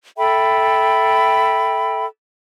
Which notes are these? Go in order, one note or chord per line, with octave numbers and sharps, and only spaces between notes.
A4 E5 G5 B5